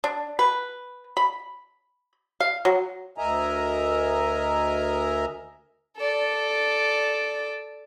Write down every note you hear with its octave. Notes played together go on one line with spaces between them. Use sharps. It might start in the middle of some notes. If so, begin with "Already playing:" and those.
D4
B4
B5
F5
F#3
D2 A#4 D#5 E5 G#5 A#5
A4 D5